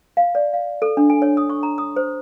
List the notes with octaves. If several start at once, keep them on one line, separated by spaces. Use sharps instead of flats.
F5
D5
F5
A4
D4
G#5
C#5
D#6
C#6
A#5
D#6
C5